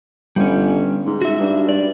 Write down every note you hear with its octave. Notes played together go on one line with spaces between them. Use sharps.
G1 G3 C#4
G#2
F#4 E5
G2
G2 D5